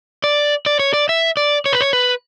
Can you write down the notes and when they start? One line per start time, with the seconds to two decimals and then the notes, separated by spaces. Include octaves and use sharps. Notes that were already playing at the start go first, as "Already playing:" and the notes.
0.24 D5
0.66 D5
0.79 C#5
0.93 D5
1.09 E5
1.37 D5
1.66 C#5
1.73 B4
1.81 C#5
1.93 B4